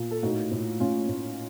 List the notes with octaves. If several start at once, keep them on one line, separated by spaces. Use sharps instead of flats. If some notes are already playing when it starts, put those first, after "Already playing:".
Already playing: A#2
A4
A2 D#4 F#4
A2
A2 C#4 F4
A2